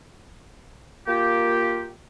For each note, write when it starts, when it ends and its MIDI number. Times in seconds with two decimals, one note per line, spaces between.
1.07 1.89 58
1.07 1.89 65
1.07 1.89 67